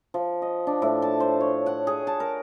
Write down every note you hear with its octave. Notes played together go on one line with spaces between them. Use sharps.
F3
D#5
D4
A2
A5
C5
C#5
F#5
G#4
A5
A#4